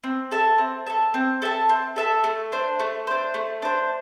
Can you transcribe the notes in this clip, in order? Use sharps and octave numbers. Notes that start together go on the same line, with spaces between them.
C4
A4 E5 A5
C4
A4 E5 A5
C4
A4 E5 A5
C4
A4 E5 A5
A3
D4 C5
A3
D4 C5
A3
D4 C5